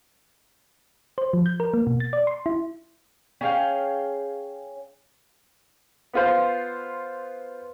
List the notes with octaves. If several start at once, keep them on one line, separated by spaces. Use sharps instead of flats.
C5
F3
G6
A#4
A#3
B2
A6
D5
C6
E4
C#4 G#4 F5 G5
B3 F4 C5